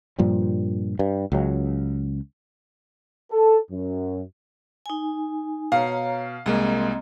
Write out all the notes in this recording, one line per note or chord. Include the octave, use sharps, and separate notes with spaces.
G2 A#2 F3 G3
G2
C#2 F#3
A4
F#2
D#4 G#5
B2 C#5 F5 A#5
C2 G#3 A#3 C4 D#5 A#5